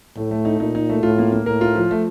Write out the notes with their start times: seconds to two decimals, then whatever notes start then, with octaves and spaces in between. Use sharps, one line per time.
0.17 A2 A3
0.31 A3
0.45 D#4
0.60 A#2 D#4
0.75 D#4
0.89 A3
1.03 A2 F4
1.18 A#3
1.32 A#3
1.46 A2 A#4
1.61 F4
1.76 F3
1.91 A3